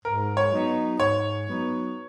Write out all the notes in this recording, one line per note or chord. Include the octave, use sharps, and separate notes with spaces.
G#2 A#4
C#5
F#3 B3 D#4
G#2 C#5
F#3 B3 D#4